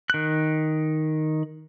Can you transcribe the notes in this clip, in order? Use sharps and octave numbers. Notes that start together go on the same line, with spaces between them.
D#3 F#6